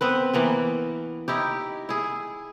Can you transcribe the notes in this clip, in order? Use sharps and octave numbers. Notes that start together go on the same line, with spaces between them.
B3 C4 B4
E3 A#3 B3
D#4 E4 G4
E4 G#4